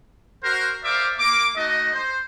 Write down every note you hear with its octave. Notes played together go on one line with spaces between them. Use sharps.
F#4 A#4 C5
A#4 C5 D5 E5 F5 D6
A#3 D6
A3 D#4 F#4 D#5
C5